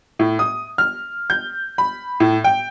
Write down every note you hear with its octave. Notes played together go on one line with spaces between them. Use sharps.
A2
D#6
F6
G6
B5
A2
G5